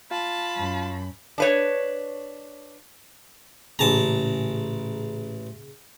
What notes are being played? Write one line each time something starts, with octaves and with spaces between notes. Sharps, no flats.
F4 A5 B5
F#2
D4 B4 C#5
A1 A#2 C#3 G#4 A5 A#5